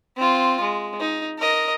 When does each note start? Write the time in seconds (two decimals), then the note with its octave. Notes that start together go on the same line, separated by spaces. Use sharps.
0.16 C4 F4
0.61 G#3
1.00 D#4
1.38 A#4 D#5